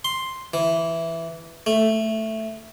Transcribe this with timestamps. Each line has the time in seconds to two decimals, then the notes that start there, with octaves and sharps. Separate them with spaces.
0.05 C6
0.54 E3
1.66 A3